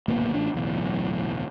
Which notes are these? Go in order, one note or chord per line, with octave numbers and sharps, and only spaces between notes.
D1 G#1 B2 A#3
A1 D4
D1 B1 E2